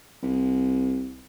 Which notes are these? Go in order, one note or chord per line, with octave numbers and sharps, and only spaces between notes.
C2